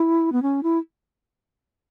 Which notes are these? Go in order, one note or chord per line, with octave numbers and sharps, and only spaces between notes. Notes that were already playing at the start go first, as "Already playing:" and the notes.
Already playing: E4
B3
C#4
E4